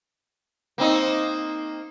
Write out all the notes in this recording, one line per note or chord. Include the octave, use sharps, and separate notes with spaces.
A#3 C4 D#4